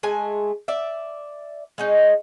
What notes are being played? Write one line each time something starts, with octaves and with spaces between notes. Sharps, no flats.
G#3 A3 G#5
D5 E5
G#3 C#4 D#4